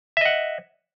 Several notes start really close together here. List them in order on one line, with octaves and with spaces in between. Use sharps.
E5 D#5 F#5